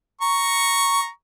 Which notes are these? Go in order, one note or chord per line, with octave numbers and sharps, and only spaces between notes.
A#5 C#6